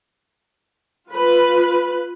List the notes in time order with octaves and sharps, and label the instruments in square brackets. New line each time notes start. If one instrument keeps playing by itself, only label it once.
[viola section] F4 B4